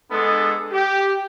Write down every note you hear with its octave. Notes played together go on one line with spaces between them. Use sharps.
G#3 B3 D4 A4
G4